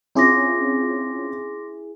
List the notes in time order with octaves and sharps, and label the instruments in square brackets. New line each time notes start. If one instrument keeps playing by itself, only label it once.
[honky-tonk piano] C4 C#4 F4 [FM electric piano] E4 G#4 [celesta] C6 D6 A#6